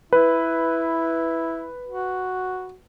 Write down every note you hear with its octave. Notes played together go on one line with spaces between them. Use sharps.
E4 B4
F#4